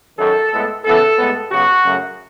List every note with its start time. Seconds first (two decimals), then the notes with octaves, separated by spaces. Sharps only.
0.18 F#2 D#3 F#3 A4
0.52 A2 G#3 B3
0.85 C#3 E3 B3 A4
1.18 A2 G#3 B3
1.51 C#3 F#3 B3 F#4
1.84 F#2 C#3 F#3 A3